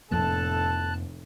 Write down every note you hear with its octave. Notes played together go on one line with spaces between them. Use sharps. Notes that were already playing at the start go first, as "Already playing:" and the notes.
F1 F2 A2 F3 A#3 A4 A5 F#6